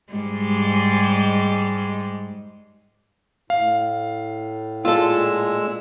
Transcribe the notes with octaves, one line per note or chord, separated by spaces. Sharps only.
G#2 G3 G#3
A2 F5
A#2 G#3 F4 A4 E6